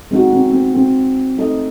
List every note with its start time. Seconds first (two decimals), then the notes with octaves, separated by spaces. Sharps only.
0.11 G#3 C4 D#4 F#4
0.33 C4
0.53 C4
0.74 C4
1.38 A3 D#4 A4 D#5